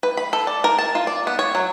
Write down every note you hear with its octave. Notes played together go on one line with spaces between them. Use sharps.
B4
B5
A4
D5
A#4
A5
F4
D5
B3
C#5
F#3